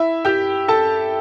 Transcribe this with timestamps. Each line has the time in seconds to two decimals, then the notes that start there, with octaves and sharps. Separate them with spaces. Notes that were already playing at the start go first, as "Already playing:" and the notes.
Already playing: E4 E5
0.25 G4 G5
0.68 A4 A5